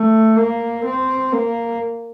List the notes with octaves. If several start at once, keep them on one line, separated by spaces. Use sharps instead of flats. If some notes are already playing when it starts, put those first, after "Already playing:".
Already playing: A3
A#3
C4
A#3